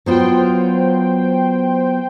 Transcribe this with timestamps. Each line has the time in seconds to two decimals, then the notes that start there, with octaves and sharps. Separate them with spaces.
0.06 F#3 B3 F4 C5 G5